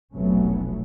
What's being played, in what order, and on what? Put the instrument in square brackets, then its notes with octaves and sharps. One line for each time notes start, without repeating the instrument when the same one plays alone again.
[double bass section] F1 B1 F#3 A3 B3 C#4